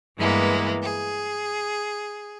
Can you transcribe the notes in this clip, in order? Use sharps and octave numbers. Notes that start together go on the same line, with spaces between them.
G2 E3 G#3 A#3 B3
G#4